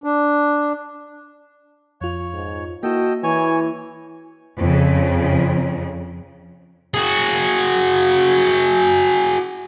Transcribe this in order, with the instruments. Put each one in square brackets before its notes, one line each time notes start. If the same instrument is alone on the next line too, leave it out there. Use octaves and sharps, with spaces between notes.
[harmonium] D4
[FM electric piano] F2 F4 [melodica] C#5
[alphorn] G#2
[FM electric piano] A#3 E4 [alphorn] F#4 [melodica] A4 D#5 G5
[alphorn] E3 [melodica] C#5 G#5
[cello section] F2 C#3
[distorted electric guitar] F#4 G#4